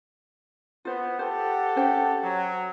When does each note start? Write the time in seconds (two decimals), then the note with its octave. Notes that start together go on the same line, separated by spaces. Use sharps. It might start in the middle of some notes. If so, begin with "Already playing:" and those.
0.85 B3 F4 C5
1.19 G4 A4 C5 F#5
1.76 C#4 C5 G5
2.23 F#3